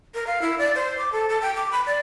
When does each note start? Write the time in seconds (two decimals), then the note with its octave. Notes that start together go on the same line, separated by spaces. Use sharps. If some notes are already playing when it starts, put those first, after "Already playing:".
0.14 A#4
0.27 F5
0.42 E4
0.58 D5
0.75 C5
0.98 D6
1.12 A4
1.29 A4
1.42 G5
1.55 D6
1.71 B5
1.86 D5